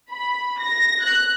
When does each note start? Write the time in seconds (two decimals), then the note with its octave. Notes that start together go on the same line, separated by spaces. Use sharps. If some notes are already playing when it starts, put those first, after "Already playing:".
0.10 B5
0.60 A#6
1.05 F#6